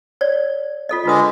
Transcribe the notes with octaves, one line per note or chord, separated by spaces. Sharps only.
C#5 D5
F4 A4 D#5
D3 G#3 F4 B4 D#6